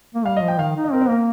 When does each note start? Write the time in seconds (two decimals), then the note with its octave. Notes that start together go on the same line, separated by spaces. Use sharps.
0.15 A#3
0.26 G3 F5
0.37 D#5
0.42 F3
0.48 G5
0.58 D#3 F5
0.76 D#4
0.84 D#5
0.92 C4 A#4
1.01 C5
1.09 A#3 A#4